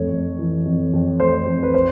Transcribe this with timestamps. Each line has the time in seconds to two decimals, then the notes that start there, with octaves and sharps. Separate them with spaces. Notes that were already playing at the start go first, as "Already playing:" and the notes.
Already playing: F2 A3 C#5
0.11 F2
0.39 E3
0.65 F2
0.93 F2
1.20 A3 C5
1.46 F2
1.63 B4
1.74 C5